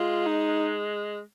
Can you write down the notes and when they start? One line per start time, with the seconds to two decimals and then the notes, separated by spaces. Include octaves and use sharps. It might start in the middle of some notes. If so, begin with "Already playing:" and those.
Already playing: G#3 F4
0.26 D#4